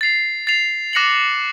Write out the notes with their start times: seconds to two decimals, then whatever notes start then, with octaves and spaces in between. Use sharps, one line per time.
0.01 A6 C7 F7
0.47 A6 C7 F7
0.93 D6 F#6 A#6 C#7 F#7